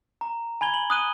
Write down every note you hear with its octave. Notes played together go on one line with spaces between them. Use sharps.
A#5
G#5 B5 G#6 G7
F#7
D#6 F#6 D#7 G7